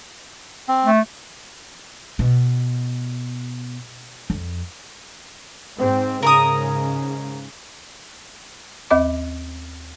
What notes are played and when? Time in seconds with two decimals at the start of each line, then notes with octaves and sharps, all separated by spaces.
0.68 C4
0.85 A3
2.19 B2
4.30 F2
5.77 G#2 C4
6.22 G#2 C#3 A#4 A#5 D#6
8.91 D#2 C4 D#5 D6